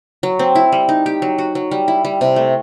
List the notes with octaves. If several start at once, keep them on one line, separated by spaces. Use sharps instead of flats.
F#3
C4
E4
G3
D#4
G4
F#3
F#4
F#3
G3
E4
G3
C3
A3